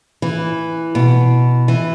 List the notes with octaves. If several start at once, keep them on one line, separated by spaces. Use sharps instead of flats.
E3
B2
E3